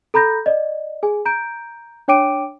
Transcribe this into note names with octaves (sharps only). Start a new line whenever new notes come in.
A4 A#5 B5 G6 A#6
D5 D#5
G#4 G#5
A#5 G6 D7
D4 C#5 G5 D6 D7 D#7